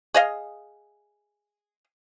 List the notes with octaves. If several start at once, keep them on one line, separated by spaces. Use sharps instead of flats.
G#4 D#5 F5